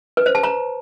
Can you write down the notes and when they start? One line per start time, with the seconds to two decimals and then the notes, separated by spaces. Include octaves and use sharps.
0.17 B4
0.26 C5
0.35 A5
0.43 A#5